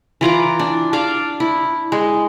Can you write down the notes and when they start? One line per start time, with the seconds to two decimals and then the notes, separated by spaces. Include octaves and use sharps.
0.21 E3 F4 A#5 D6
0.59 D4
0.93 D4 F5 D6
1.40 E4
1.92 G#3